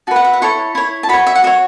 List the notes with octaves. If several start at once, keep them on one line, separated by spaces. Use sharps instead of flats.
F#4 B4 A5
F#5
E5
F#5
E4 A4 C#5 C#6
E4 C#5
A5
F#4 C#5 B5
E5
F#5
F#4 C#5 E5